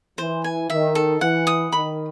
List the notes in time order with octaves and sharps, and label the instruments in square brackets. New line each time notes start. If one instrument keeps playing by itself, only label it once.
[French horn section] E3 [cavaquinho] C5
[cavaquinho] G#5
[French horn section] D#3 [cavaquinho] E5
[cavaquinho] A4
[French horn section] E3 [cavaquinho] F#5
[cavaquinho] D#6
[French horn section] D#3 [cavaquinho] B5